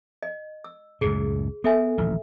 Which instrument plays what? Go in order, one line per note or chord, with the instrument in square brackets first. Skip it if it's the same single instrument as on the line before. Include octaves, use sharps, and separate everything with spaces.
[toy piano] D#5
E6
[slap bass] C#2 F#2 A2 [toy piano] G#4
[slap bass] B3 [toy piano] A4 E5 G#5
[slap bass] D#1 A1 F3